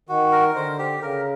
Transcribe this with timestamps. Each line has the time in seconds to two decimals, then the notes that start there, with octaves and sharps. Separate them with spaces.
0.09 D#3 F#4
0.32 A#4
0.55 D3 C5
0.78 G4
1.02 C#3 A#4